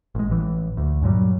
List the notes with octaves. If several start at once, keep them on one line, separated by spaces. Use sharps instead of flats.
A1 G#3
A1 E3
D2
G2 A#2 F#3 G3